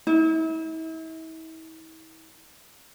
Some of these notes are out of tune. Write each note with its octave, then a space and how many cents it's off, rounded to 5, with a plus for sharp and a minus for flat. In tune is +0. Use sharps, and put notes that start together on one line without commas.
E4 -40